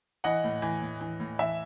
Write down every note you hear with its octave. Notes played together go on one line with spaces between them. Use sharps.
E3 D#5 F#5
A2
E3
A2
E3
A2
E3 E5